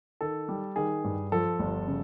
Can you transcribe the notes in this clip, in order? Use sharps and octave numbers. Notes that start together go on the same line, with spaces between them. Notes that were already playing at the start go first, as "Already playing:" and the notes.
D#3 A4
G3
D#3 G#4
G2
F3 A4
G1
C#3